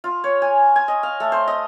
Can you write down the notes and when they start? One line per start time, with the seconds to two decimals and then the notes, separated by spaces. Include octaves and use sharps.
0.04 F4
0.24 C#5
0.42 G#5
0.76 G#5
0.88 D#5
1.03 F5
1.20 A3
1.32 C5
1.48 D#5